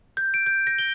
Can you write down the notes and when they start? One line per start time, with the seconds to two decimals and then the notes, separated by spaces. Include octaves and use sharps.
0.17 G6
0.34 D7
0.46 G6
0.67 A#6
0.79 G7